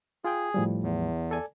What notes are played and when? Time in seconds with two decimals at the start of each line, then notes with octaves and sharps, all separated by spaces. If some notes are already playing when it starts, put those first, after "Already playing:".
0.24 F4 G#4 G5
0.54 A2 F3 G3
0.83 E2
1.31 A4 D5 G#5